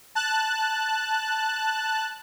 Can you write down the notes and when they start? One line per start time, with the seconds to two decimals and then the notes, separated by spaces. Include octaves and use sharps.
0.15 A5 F#6